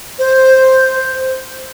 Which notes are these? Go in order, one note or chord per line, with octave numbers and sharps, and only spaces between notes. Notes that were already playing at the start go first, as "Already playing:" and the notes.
C5